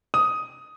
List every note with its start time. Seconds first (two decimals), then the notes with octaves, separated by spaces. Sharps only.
0.14 D#6